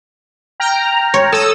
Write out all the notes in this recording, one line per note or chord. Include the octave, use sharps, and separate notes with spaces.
G5 A#5 F6
C#5
A4 A5 D#6 E6